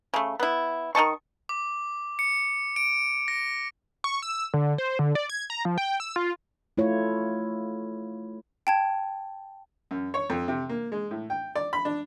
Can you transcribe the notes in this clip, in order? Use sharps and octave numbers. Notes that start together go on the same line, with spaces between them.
C#3 A3
B3 E4
D#3 D#5 A5 C#6
D6
C#7
D7
A#6
C#6
E6
D3
C5
D3
D5
G#6
A#5
F3
G5
E6
F4
A3 E4 F4 C#5
G5 A5 G#6
F#2
C#5
F2
C3
A#3
G#3
A2
G5
D5
B5
D4